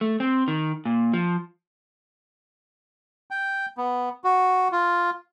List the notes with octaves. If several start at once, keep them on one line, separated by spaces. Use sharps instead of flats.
A3
C4
D#3
A#2
F3
G5
B3
F#4
F4